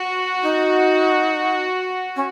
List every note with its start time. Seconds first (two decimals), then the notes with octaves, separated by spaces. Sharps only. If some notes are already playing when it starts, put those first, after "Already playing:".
Already playing: F#4
0.42 D#4
2.15 C#4